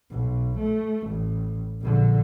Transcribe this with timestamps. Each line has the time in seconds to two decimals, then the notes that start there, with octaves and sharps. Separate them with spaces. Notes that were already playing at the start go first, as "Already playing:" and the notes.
0.10 B1
0.59 A3
1.08 A1
1.81 A#1 D3